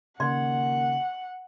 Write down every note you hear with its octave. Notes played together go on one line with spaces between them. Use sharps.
D#2 C#3 D5 F#5 C6